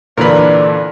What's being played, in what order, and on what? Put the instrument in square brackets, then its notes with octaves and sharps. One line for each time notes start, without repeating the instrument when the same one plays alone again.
[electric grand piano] A#2 D3 E3 [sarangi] D4 [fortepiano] A#4 B4